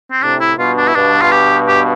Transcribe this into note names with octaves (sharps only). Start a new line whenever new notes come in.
C4
A2 C3 D4
E4
G2 B2 F4
D4
E4
G2 B2 D4
F4
G4
G4